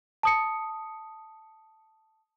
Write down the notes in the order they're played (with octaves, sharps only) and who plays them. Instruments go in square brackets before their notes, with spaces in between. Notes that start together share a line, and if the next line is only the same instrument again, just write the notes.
[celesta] A5 D#6 C#7